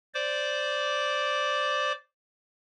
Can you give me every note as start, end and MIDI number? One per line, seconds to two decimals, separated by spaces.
0.14 1.92 72
0.14 1.92 74
0.14 1.92 86